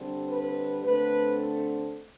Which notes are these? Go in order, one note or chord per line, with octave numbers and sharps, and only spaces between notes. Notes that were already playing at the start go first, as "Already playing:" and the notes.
Already playing: D3 G3 C4
B4
D3 A3 C4 B4